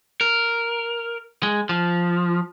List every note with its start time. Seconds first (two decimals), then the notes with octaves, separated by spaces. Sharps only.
0.21 A#4
1.43 G#3
1.69 F3